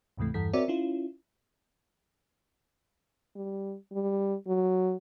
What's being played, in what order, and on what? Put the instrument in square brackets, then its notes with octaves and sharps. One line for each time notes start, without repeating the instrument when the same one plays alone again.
[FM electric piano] D2 G#2 C3 E3 A3
E2 G2 E3 A4 B6
C4 F#4 A#4 C#5 D5 E5
C#4 E4 F4
[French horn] G3
G3
F#3